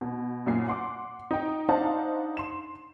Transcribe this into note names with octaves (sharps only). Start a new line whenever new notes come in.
B2
F#2 A#2 C7
F#5 C6 D6
D#4 G5
D4 D#4 C5 F5 F#5 A5
C6 E7